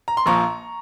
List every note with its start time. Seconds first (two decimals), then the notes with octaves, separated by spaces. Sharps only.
0.08 A#5
0.17 C6
0.26 A#1 A#2 F3 A#5 C#6